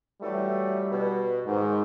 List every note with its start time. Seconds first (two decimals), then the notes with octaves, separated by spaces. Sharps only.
0.21 E3 F#3 G3 A3
0.92 B2
1.46 G#2 D#3